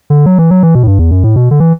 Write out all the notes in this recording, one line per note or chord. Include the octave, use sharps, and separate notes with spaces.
D3
F#3
E3
F#3
E3
B2
A2
G2
E2
F#2
A2
B2
D3
E3